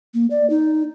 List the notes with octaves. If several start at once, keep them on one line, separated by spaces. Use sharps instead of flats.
A#3
D5
D#4